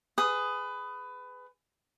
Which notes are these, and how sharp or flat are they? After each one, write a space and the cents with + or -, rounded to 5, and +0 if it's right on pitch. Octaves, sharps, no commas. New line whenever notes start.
G#4 +0 B4 +20 D#6 +0